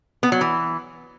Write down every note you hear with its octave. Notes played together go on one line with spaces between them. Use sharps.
B3
F#3
E3